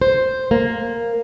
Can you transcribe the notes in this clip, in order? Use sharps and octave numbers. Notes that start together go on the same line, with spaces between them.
C5
A#3